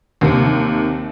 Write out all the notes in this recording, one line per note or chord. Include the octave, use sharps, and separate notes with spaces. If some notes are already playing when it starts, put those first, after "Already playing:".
D#2 C3